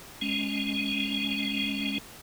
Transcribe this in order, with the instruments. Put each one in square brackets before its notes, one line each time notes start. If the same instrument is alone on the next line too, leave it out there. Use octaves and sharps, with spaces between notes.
[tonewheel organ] G#3 C#4